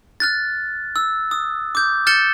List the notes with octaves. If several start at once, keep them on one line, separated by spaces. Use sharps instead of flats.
F6 F#6 A6
E6
D#6
D6 G6
F6 G6 A6 C#7 E7 G7